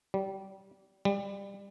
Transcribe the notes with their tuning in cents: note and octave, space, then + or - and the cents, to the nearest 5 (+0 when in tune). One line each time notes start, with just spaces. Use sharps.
G3 -20
G3 +25